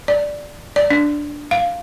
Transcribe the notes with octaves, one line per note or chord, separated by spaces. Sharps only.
D5
D5
D4
F5